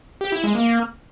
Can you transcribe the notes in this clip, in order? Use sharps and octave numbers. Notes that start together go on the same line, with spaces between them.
G4
E4
G#3
A#3